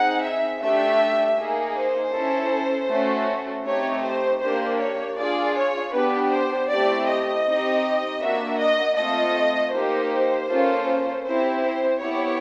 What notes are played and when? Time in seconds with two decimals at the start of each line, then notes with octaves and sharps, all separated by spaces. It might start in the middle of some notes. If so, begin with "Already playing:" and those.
Already playing: C4 D#4 G#4 F#5
0.24 E5
0.62 A3 D4 G4 E5
1.38 A#3 D#4 G#4
1.75 C5
2.13 C#4 E4 A4
2.90 A3 C#4 F#4 A4
3.65 A3 C4 D#4 G4 C#5
4.04 C5
4.42 A#3 D4 G4 C5
4.79 C#5
5.18 D4 F4 G#4 D5
5.57 C#5
5.94 B3 D4 G4 B4
6.32 C5
6.70 A3 C4 E4 G4 D5
7.08 D#5
7.46 C4 D#4 G4
8.23 A#3 D4 F#4 E5
8.60 D#5
8.98 A3 C4 F4 A4 D#5
9.75 A#3 D#4 G4 C5
10.50 A#3 C#4 F4 A4
11.26 C4 E4 G4 C5
11.64 C5
12.02 B3 E4 G4 C#5